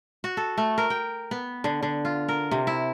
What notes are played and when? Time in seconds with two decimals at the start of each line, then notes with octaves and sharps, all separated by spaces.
0.24 F#4
0.37 A4
0.58 A3
0.78 A#4
0.90 G5
1.31 B3
1.64 D3
1.83 D3
2.05 F4
2.28 A#4
2.51 C3
2.67 E4